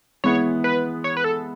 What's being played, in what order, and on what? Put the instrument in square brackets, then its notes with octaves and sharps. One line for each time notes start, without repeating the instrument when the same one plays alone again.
[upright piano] E3 G#3 B3 [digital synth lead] C#5
[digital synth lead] B4
C#5
B4
A4